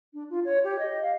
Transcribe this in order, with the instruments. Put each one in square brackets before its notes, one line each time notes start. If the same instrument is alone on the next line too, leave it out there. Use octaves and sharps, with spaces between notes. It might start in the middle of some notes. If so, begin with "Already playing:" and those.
[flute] D4
F4
C#5
G4
D#5
F5